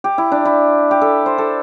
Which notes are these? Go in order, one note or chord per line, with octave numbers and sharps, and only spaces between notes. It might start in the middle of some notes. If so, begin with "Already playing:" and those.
G4
E4
D4
E4
G4
A4
C5
A4